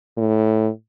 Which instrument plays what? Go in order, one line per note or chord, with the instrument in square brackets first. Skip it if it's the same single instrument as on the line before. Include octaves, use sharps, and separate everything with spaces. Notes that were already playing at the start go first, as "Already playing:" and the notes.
[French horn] A2